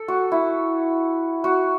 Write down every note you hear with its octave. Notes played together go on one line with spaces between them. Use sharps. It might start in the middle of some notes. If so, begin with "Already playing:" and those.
Already playing: A4
F#4
E4
F#4